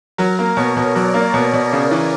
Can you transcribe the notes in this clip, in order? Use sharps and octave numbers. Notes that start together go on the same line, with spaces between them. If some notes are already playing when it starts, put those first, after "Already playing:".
F#3 A#4
A#3
B2 C#5
B2
F#3 D5
A#3
B2
B2
C#3
E3